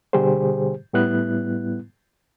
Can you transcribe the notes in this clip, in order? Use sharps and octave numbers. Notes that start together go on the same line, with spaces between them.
B2 D3 G3 G4 G#4 C5
A2 G3 B3 E4 F#6